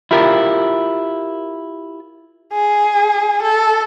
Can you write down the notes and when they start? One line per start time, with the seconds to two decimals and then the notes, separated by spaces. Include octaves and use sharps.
0.11 E4 F4 G4 A#4
2.53 G#4
3.43 A4